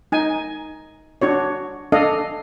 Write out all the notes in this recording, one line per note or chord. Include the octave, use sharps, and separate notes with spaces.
D#4 G#5
D4 F#4 C#5
D4 A4 D#5 F5